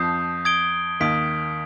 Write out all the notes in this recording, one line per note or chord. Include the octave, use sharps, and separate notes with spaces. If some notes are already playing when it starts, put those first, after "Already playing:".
Already playing: F2 F3 D#6 G6 C7
D#6 G#6 D7 G7
D#2 D#3 D#6 B6 D7